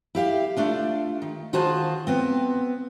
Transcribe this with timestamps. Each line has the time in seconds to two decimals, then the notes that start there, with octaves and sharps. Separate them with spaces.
0.15 E4 G4 F5
0.57 A3 D4 F4
1.22 D#3
1.53 D#3 F4 F#4 G#4 C5 A5
2.07 B3 C4